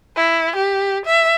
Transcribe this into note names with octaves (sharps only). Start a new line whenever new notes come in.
E4
G4
E5